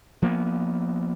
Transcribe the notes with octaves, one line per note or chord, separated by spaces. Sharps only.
F3 A#3 B3